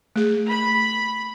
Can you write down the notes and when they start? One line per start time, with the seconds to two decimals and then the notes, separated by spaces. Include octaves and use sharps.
0.16 A3 G#4
0.48 B5